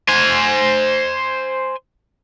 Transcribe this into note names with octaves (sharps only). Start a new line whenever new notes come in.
C5 G#5